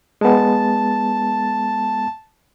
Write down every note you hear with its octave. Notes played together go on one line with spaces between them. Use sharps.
G#3 B3 A5